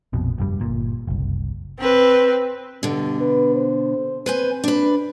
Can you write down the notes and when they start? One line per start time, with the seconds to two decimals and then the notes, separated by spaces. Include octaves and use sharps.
0.13 A#1 F2 B2
0.38 F1 G2 G3
0.60 G1 A#2
1.07 F#1 C2
1.80 C4 B4
2.83 G2 B2 D3
3.21 B4
3.55 C5
4.26 C4 B4 C5 G#5
4.64 D4 B4